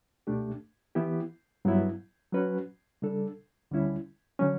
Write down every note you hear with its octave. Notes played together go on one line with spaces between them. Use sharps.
C#2 B2 A3 D4 G4
E3 B3 E4 G4
G2 F#3 B3 E4
F#3 C#4 F#4 B4
C#3 G3 D4 A4
D2 D3 G3 C#4 E4
D3 F#3 C#4